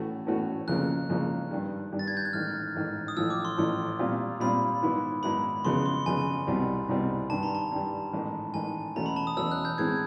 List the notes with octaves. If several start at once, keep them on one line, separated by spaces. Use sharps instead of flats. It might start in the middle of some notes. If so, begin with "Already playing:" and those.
Already playing: A2 E3 A3 C#4 F#4
A2 E3 A3 C#4 F#4
F2 C#3 F3 A#3 C#4 F#6
F2 C#3 F3 A#3 C#4
G2 D#3 G3
G2 D#3 G3
A6
G#6
G6
F#6
A1 G#2 D#3 F6
A1 G#2 D#3
D#6
A1 A2 F3 E6
D6
C6
A1 A2 F3
A#2 G3 C4 F4
A#2 G3 C4 F4 B5
G#2 D#3 F#3 B3 E4
G#2 D#3 F#3 B3 E4 B5
F2 C#3 F#3 B3 C6
C6
F2 C#3 F#3 B3 G#5
C2 B2 G3 C4
C2 B2 G3 C4
G2 D#3 G3 A5
A#5
A5
G2 D#3 G3
A1 G#2 D#3
A1 G#2 D#3 G#5
E2 B2 F#3 A3 C#4 A#5
B5
A5
D#6
E2 B2 F#3 A3 C#4 E6
F#6
G6
A2 E3 G#3 C4 G#6